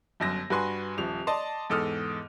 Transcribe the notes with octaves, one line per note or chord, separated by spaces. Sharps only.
G1 F#2 A#6
G2 F#4 B4 G#5 C6
D#1 F3 F7
D5 D#5 A5 C6
E2 G#2 A4 D#6 F6